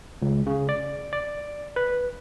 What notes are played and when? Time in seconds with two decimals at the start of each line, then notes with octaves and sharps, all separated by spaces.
0.22 C#2
0.46 C#3
0.69 D5
1.13 D5
1.76 B4